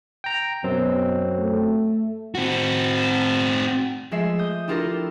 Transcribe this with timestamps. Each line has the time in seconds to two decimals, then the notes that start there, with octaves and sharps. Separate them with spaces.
0.24 G5 A#5
0.64 F#2 B2 F#3 C4
1.38 A3
2.35 C4 F#4
4.11 F3 G#3 A3 E5 C7
4.39 D#6 G6
4.68 D4 E4 F4 G4 A4 A#4